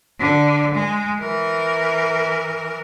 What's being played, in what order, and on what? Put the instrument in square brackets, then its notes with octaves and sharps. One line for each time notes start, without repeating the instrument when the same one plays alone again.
[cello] D3
G#3
E3 A#4